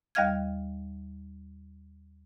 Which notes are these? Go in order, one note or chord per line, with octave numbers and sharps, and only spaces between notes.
D#2 G3 D#5 F5 F6 G#6